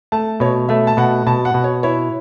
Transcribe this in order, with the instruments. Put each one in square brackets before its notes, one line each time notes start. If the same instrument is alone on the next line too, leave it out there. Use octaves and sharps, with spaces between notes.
[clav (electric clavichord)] A3 [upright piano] A5
[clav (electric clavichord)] B2 [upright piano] C#5
[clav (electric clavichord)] A3 [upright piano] E5
[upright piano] A5
[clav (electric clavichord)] B2 [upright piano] F#5
[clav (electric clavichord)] B2 [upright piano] A5
[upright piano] F#5
[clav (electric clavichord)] B2
[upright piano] C#5
[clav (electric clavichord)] E4 [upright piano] C#5